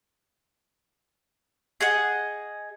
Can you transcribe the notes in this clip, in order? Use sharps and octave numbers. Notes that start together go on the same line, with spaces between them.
G#4 D#5 F#5